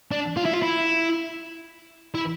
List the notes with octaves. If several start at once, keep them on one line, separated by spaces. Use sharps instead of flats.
D4
F4
E4
F4
E4
E4